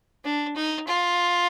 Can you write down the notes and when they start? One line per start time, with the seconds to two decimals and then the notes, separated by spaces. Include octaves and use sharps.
0.24 D4
0.56 D#4
0.87 F4